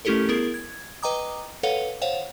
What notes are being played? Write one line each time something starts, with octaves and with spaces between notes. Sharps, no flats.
A3 C#4 E4 G4 A4 A#4
B3 E4 G#4 A#4
G#6
B4 D#5 G5 A#5 D6 D#6
A4 B4 C#5 F5 F#5
C5 C#5 F5 F#5